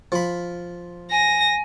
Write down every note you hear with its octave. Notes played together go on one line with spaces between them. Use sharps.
F3 B5
G#5 A#6